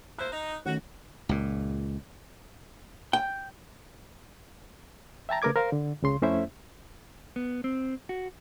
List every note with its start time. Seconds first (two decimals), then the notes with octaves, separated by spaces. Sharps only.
0.19 A#3 E4 C5 F#6
0.32 D#4
0.65 D#3 A3 C#4 F#4
1.29 C#2 A#2
3.13 G5
5.29 E5 G5 A5 A#5
5.42 C#3 A3 A#4 B4 D6 G#6
5.56 A#4 C5 F5
5.72 D3
6.02 C#2 C#3 C6
6.22 F2 A3 C#4 E4 C5 E5
7.36 B3
7.64 C4
8.09 F#4